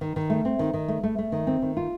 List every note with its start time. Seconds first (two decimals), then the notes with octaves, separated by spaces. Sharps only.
0.01 D#3
0.16 D#3
0.30 A3
0.45 C4
0.59 D#3
0.74 D#3
0.88 A3
1.03 A3
1.18 A3
1.32 D#3
1.47 C4
1.62 D#3
1.77 F4